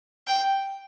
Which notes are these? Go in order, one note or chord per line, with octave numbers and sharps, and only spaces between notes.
G5